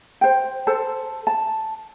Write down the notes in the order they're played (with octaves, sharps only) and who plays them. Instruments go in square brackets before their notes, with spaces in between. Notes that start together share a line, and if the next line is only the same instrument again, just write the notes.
[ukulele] C5 G5
A4 C5 A5
A5